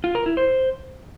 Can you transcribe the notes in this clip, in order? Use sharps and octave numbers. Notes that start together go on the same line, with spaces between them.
F4
A#4
E4
C5